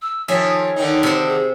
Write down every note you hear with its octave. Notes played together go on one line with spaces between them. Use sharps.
E6
D#3 F3 C#4 G#4 C#5 E5
D3 D#3 D#4
C3 C5
G#4